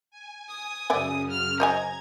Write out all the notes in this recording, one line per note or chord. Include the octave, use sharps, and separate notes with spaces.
G#5
D#6
F#2 C#3 D5 E5 G#5
F6
C5 D#5 G#5 A#5 G#6